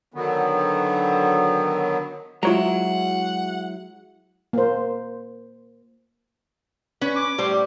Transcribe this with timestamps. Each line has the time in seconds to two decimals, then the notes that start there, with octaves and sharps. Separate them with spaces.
0.14 D3 D#3 F#3 B3
2.43 F#3 G#3 E4 F4 C#5 F#5 A#5
4.53 A#3 C5
7.01 C#4 B4
7.16 D6
7.38 A2 G3 C5